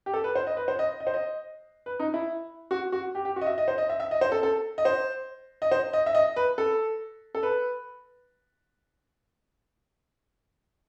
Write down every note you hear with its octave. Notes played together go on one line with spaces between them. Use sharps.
G4
A4
B4
C5
D#5
B4
C5
D#5
D#5
C5
D#5
B4
D#4
E4
F#4
F#4
G4
G4
F#4
D#5
E5
D#5
C5
D#5
E5
E5
D#5
C5
A4
A4
D#5
C5
D#5
C5
D#5
E5
D#5
B4
A4
A4
B4